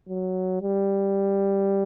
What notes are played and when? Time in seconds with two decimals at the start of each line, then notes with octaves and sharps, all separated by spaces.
0.08 F#3
0.62 G3